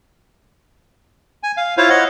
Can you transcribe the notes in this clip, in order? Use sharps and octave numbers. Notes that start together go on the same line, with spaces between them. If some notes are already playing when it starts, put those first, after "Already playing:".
G#5
F5
E4 F4 C5 C#5 F5
C#5 D#5 F#5